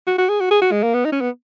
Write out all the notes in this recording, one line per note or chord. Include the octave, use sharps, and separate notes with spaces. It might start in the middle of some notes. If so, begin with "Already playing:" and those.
F#4
F#4
G#4
F#4
G#4
F#4
G#3
A#3
B3
D#4
C#4
B3